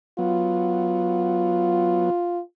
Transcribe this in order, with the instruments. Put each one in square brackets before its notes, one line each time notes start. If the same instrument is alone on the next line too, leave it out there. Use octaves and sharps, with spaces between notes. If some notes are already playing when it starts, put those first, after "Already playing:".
[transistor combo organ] F#3 B3 [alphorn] F4